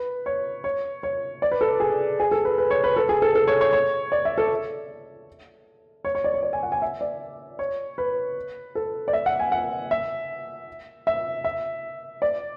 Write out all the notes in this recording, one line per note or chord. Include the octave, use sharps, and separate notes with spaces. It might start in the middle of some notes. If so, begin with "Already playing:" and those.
Already playing: B4
C#5
C#5
C#5
D5
B4
A4
G#4
G#4
A4
B4
B4
C#5
B4
A4
G#4
A4
A4
C#5
C#5
C#5
D5
E5
A4
C#5
C#5
D5
C#5
D5
G#5
F#5
G#5
E5
D5
C#5
B4
A4
D5
E5
F#5
G#5
F#5
E5
E5
E5
D5